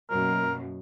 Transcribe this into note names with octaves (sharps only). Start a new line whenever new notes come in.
F#2 B2 A#3 A#4